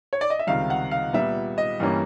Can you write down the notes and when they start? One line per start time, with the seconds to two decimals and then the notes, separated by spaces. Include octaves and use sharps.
0.13 C#5
0.21 D5
0.30 D#5
0.39 E5
0.47 C#2 C3 D#3 G3 F5
0.70 F#5
0.91 F5
1.13 A#2 G3 B3 E5
1.58 D#5
1.80 G2 E3 G3 A#3 C#4